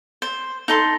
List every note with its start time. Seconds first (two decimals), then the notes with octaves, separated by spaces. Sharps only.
0.22 C5
0.68 D#4 A4 C6